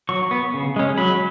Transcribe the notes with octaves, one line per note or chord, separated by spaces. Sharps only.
F#3 C#6
B3
C#3
G#3 C#4
F#3 B5